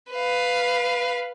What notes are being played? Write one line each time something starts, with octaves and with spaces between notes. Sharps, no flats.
B4 F5